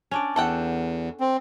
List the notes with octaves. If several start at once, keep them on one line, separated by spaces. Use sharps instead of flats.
C#4 D4 D5
E2 A4 F#5 G5
C4